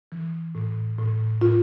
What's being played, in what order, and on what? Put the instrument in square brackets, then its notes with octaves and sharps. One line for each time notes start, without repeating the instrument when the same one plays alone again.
[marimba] E3
A2
A2
A2 F4